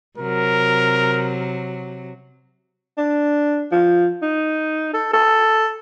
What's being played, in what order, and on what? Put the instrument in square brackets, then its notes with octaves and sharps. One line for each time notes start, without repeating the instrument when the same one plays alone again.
[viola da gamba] C3 F#3 [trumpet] A#4
[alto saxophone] D4
F3
D#4
A4
A4